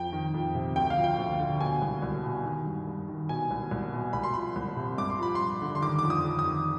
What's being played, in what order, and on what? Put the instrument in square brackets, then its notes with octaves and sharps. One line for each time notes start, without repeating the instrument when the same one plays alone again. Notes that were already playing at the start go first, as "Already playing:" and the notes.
Already playing: [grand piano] F2 G5
D#3
F2
C3
D2 G5
F5
F3
G5
D2
D3
B2 G#5
C2
C2
B2
D#3
G2
G2
D#3
B2 G#5
C2
C2
B2
C2 B5
C6
F3 B5
C2
C3
G2 D6
C6
F3 B5
C6
G2
D3
C6
D#3 D6
F2 D6
D#6
F2
D#6
D#3